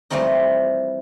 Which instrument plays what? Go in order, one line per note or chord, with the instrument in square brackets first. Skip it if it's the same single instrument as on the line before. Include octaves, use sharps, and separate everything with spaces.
[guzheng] E3 F3 G3 A3 C4 D#4